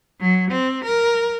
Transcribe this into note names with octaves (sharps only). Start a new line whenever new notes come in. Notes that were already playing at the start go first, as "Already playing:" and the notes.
F#3
C4
A#4